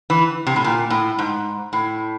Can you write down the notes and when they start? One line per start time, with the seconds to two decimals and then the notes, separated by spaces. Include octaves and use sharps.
0.10 E3
0.47 C3
0.56 A2
0.64 A#2
0.90 A2
1.18 G#2
1.73 A2